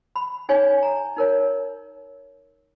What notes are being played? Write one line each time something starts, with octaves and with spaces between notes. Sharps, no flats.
B5
D#4 G#4 C#5 G#5
A#5
D#4 A#4 C#5